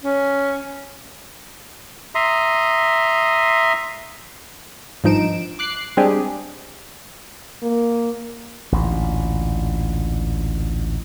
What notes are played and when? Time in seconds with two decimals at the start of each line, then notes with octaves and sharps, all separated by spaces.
0.04 C#4
2.15 E5 A#5 C6 D#6
5.04 G#1 G2 F3 D#4 D7 E7
5.59 D6 F#6 C7
5.97 G3 G#3 C4 D4 G4 G#4
7.63 A#3
8.72 A1 D2 A#2